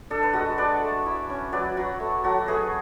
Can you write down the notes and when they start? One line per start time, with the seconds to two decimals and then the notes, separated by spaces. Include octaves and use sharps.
0.10 D4 A4
0.23 B4
0.33 G#3 F#4 A4
0.58 D4 B4 D5
0.81 A3
1.06 E4
1.30 C#4
1.52 F#3 B4 D5
1.77 F#3 F#4
2.00 A3
2.24 F#3 F#4 A4
2.48 A3 G#4 B4